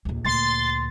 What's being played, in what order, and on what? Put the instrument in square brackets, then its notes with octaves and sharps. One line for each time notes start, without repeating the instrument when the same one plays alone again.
[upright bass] A#1 D#2
[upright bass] D2 A#2 [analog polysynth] C6 A6